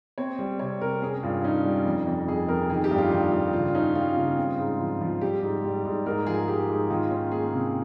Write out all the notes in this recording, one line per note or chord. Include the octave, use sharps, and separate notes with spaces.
C4 C#5
G3
C3 C#5
C3 A#4
C#4 G#4
G2 F4
C#4 D#4
G3
F2
F2
F2 G#4
F2 A#4
D#3 G#4
G4
G2
F4
D#3 F4
G2
C#3 F4
C#4 D#4
G3 F4
C#3
C4
G#2
F3
F3
G3 G4
G#2
G3
G#2
G#2 A#4
F3 G#4
G#2 G4
G#2
D#3 F4
C#4
A#3 G#4
C3